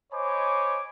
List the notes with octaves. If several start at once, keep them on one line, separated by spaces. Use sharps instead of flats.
C5 C#5 D#5 G#5 B5 D6